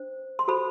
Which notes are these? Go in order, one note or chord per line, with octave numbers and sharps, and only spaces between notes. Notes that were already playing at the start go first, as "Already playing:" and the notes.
Already playing: D4 C5
C6
F#4 A4 C5 B5